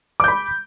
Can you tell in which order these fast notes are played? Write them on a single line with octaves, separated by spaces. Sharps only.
D6 G6 B5